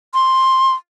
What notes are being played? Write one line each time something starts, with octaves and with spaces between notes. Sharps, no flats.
C6